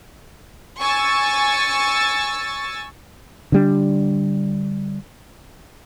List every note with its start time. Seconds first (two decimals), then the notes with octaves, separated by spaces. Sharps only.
0.80 G#5 C#6 E6 A6
3.52 D3 G3 D4